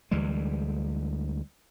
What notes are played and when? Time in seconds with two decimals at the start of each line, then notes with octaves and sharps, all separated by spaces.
0.11 D2 E3 G3 G#3